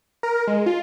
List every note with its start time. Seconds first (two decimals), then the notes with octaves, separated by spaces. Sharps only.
0.23 A#4
0.48 G#3
0.66 F4